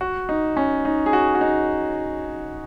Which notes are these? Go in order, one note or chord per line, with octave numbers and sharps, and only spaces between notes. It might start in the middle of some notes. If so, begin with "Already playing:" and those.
F#4
D#4
C#4
D#4
G#4
F#4
F#4
D#4